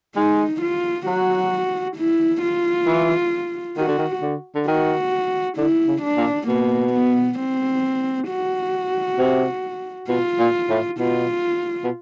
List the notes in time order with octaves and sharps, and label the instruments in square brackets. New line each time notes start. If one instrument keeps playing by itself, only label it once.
[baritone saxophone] G#3 [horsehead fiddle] D#4
[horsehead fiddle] F4
[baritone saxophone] F#3 [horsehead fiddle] F#4
[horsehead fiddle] E4
F4
[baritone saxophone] E3
[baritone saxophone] D#3 [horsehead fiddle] F#4
[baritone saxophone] D3
D#3
D3
D3
[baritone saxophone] D#3 [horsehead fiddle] F#4
[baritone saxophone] D3 [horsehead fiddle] E4
[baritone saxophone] C#3
[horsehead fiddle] D4
[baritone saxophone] A#2
[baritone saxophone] B2 [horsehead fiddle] A#3
[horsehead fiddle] B3
C4
F#4
[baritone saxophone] C3
[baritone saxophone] B2 [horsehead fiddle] F4
[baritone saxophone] A#2
A2
[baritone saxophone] B2 [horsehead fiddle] F4
[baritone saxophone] B2